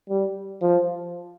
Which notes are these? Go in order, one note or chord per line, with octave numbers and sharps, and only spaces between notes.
G3
F3